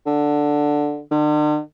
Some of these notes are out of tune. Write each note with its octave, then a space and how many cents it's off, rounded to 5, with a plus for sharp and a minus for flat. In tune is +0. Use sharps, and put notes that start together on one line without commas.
D3 +5
D3 +45